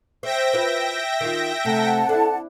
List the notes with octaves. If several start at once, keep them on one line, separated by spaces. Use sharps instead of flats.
C5 E5 G5 A#6
F4 B4
D#3 F4
C3 A3 F#5 A5
D4 E4 A4